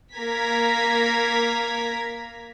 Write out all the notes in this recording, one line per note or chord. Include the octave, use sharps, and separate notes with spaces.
A#3 A#4 A#5 G#6 B6